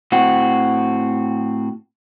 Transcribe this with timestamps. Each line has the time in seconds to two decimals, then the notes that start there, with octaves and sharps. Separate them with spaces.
0.12 A2 C4 F#4